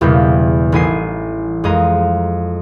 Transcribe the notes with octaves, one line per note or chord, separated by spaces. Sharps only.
E1 E2 C#3 G3
A1 E4 D#5 G#5 C7
F2 G#3 G#4 D#5 A#5